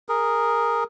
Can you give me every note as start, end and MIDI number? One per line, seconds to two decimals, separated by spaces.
0.09 0.84 68
0.09 0.84 70